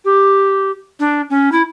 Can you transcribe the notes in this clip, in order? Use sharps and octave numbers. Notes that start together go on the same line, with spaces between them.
G4
D4
C#4
E4